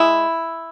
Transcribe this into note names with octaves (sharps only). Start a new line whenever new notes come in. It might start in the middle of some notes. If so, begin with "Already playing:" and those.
Already playing: G#3 E4